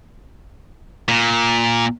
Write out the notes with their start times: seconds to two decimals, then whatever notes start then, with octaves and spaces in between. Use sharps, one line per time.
1.08 A#2